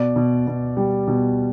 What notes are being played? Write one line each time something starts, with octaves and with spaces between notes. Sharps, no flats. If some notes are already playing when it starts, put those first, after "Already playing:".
Already playing: B2 D5
B2
B2
G3
B2